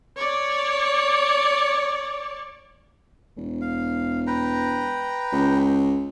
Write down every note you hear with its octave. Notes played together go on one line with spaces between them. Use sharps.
C#5 D5
E1
F5
B4 G5 A#5
C#2